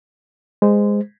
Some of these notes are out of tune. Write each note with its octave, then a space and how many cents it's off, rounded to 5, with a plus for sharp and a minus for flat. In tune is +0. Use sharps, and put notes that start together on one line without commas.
G#3 -15 C5 -20